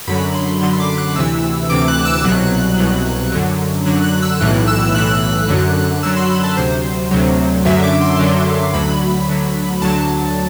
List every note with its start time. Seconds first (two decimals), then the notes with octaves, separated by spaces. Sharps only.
0.07 F#2 D3 F#3 B5
0.35 C6
0.61 F#2 D3 F#3 C6
0.80 D6
0.98 F#6
1.16 D2 C3 E3 E6
1.69 D2 C3 E3 D6
1.88 F#6
2.05 E6
2.24 C2 B2 F#3 F#6
2.78 C2 B2 F#3
3.32 F#2 D3 F#3
3.86 F#2 D3 F#3 F#6
4.04 F#6
4.22 E6
4.40 B1 A2 E3 F#6
4.67 E6
4.94 B1 A2 E3 F#6
5.48 F#2 D3 F#3
6.03 F#2 D3 F#3 E6
6.17 C6
6.30 B5
6.44 A5
6.57 D2 C3 F#3 C5
7.11 D2 C3 F#3
7.65 F#2 D3 F#3 E5
7.83 D6
8.01 C6
8.19 F#2 D3 F#3
8.73 D2 D3 F#3 B5
9.28 D2 D3 F#3
9.82 D2 D3 F#3 A5